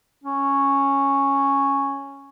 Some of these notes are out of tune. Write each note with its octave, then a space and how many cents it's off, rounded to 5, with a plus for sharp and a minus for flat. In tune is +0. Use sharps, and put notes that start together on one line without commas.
C#4 -5